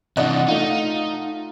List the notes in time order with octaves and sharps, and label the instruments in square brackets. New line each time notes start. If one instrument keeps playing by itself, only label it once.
[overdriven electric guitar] C3 E3 [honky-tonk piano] D4 D5 D#5 [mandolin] F#5
[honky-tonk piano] A3 F4 [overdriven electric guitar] D#4